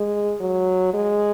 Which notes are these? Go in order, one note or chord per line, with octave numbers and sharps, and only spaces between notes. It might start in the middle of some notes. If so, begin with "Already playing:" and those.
Already playing: G#3
F#3
G#3